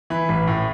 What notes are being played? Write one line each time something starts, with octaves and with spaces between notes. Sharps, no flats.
E3 B5
A1
A2